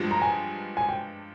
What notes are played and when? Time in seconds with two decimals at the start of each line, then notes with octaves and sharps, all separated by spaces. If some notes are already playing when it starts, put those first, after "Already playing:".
Already playing: G2 F3 G#3 D4 G4
0.11 A#5
0.22 G#5
0.77 G#5
0.89 G5